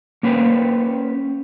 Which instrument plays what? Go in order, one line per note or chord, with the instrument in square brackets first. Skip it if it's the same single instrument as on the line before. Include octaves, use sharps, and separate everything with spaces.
[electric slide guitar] A#3 C#4 B4 C5 G5